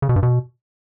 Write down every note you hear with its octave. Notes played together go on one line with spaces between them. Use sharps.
C#3
B2
G2
B2